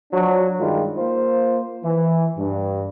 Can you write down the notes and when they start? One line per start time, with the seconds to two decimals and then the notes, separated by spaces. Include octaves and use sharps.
0.13 F3 F#3 D4 F#4
0.59 G2 D#3 G3 G#3 F4
0.96 A#3 F4 C5
1.84 E3
2.37 G2